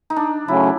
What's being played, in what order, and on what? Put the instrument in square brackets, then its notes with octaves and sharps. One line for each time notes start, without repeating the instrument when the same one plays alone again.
[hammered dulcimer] D#4
D4
[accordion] C#3 F#3 A3 C#4 [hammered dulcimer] E4